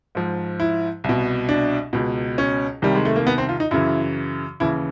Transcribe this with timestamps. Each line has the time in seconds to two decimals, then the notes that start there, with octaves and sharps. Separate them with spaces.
0.15 G#2 F3
0.60 E4
1.04 C2 B2
1.49 D4
1.93 C#2 B2
2.38 C#4
2.82 C2 C3 D#3 G3
2.95 G#3
3.05 A3
3.16 A#3
3.27 B3
3.38 C4
3.49 F4
3.60 D#4
3.71 F#2 C#3 E3 E4
4.60 D#2 C#3 E3 E4